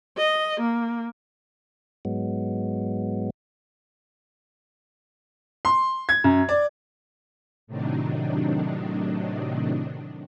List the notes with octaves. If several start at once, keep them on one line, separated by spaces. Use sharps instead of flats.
D#5
A#3
G#2 F#3 G#3 B3
C6
G#6
F#2
D5
A2 C3 D#3 F#3 D4 D#4